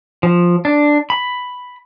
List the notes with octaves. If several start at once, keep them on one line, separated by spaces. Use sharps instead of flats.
F3
D4
B5